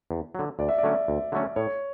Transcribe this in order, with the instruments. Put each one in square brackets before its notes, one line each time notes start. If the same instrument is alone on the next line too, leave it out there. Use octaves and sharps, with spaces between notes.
[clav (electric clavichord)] E2
D3 F#3
[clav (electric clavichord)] D2 [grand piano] D5
[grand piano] E5
D5
[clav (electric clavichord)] D3 F#3 A3 C#4
D2
D3 F#3 A3 C#4
[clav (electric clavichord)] A2 [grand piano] C#5